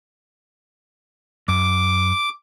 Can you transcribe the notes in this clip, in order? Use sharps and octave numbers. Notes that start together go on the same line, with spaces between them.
F#2 D6